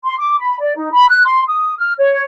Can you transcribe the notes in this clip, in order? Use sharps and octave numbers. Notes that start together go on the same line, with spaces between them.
C6
D6
B5
D5
D#4
B5
F#6
C6
D#6
F6
C#5